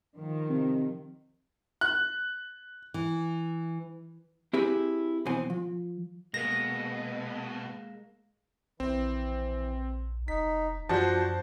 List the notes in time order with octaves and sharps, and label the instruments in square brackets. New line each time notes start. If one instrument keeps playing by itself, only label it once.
[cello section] D#3 F3
[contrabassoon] C3
[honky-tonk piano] F#6
[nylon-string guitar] E3
[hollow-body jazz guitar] C4 E4 G4 G#4 B4
B1 F2 E3 B3 C4 G#5
F3
[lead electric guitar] B2 [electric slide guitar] G#3 A#3 [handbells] A#6
[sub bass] A#1 [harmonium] E3 [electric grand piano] C4
[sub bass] F1 [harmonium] D#4 [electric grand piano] B6
[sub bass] F#2 [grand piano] F3 F#4 [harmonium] D4 [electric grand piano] C5 A5